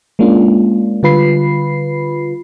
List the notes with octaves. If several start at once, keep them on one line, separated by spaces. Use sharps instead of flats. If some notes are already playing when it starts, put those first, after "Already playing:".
G#3 A#3 C#4 D4 F4
D3 G3 F4 B4 B5 C7